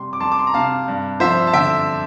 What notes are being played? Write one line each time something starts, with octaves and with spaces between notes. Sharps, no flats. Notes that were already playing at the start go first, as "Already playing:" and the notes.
Already playing: C3 G3 C6
D6
G3 A5 C6
D6
C6
A#5
C3 F5 A5
G2
F3 C5 E5
A5
D3 E5 G5